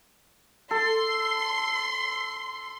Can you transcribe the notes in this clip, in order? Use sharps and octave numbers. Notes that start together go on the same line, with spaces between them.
A4 C6